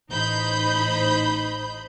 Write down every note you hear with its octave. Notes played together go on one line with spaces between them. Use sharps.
A1 D#4 C5 B5 G6